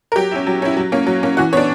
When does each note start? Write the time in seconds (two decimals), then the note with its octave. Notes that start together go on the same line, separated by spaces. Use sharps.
0.12 A#4
0.16 F#3 G4
0.31 C#4 E4
0.47 F#3
0.62 C#4 E4
0.77 F#3
0.92 A#3 C#4
1.07 F#3
1.23 A#3 C#4
1.37 E3 F#4
1.53 B3 D4 C#5